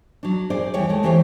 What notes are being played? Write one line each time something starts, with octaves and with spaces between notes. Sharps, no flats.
F#3 D4
A#2 G#4 C5 D5
D#2 E3 G3 C#5 D5 G5
G#3 A3
E2 E3 G4 C5 C#5